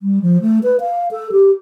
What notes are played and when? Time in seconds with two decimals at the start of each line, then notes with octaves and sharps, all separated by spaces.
0.01 G3
0.22 F3
0.42 A3
0.63 B4
0.80 F5
1.11 A4
1.32 G4